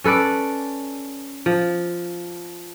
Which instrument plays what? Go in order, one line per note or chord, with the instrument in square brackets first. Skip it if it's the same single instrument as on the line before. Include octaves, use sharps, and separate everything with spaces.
[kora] C#4 A4 B4 D5
F3